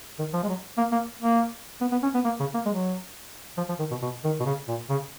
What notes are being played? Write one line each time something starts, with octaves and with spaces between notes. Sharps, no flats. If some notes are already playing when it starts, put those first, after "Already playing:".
D#3
F3
G#3
F#3
A#3
A#3
A#3
B3
B3
C#4
B3
A#3
C#3
A#3
G#3
F#3
F3
F3
D#3
B2
B2
D#3
B2
C#3
A#2
C#3